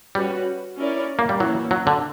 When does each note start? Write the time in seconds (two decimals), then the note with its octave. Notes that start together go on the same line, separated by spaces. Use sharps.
0.15 G3 C#4 F#4 B4
0.77 C#4 E4 A#4 D5
1.19 A#3
1.29 G3
1.40 E3 F#3 A#3 C#4 E4
1.71 F#3
1.87 D3